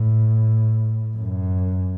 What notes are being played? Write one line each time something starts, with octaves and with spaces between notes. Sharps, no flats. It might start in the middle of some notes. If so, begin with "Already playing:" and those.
Already playing: A2
F#2